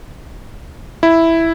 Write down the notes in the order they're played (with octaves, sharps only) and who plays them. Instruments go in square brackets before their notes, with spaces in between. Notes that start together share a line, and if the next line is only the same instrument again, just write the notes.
[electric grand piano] E4